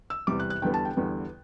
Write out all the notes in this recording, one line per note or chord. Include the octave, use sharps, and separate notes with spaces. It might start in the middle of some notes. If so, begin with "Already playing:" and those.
E6
E2 C3 G3 D6
F#6
F#6
E2 D3 G3 B3 G5
A5
G5
E2 D3 G3 B3